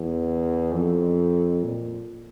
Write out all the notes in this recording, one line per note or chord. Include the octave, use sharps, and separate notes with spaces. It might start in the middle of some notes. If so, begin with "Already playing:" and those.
Already playing: E2
F2
A#2